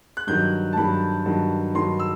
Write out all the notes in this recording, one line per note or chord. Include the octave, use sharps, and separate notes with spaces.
F#6
G2 D#3 F#3 G6
A5
G2 D#3 F#3 B5
G2 D#3 F#3
G2 D#3 F#3 C6
E6